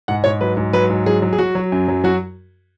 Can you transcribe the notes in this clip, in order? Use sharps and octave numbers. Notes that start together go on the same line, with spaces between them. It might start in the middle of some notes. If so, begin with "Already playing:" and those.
G#2 F#5
G#2 C#5
F#3 B4
G#2
F#3 B4
G#2
F#3 G#4
F#3
G#4
F#3 F#4
F#3
F#2
F#3
F#3 F#4